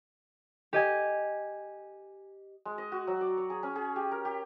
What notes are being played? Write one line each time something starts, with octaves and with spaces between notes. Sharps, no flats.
G4 D#5 G#5
G#3
D#5
F#4
F#3
D5
C#5
G#4
C#4
G#4
G4
A#4
G4